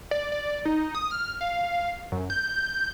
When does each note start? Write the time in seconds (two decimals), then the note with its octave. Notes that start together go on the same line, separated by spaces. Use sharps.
0.11 D5
0.32 D5
0.65 D#4
0.95 D#6
1.11 F6
1.41 F5
2.12 F#2
2.30 G6